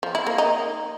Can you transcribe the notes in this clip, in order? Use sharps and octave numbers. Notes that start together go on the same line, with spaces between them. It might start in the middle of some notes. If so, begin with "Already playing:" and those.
F3
E4
A#3
D#4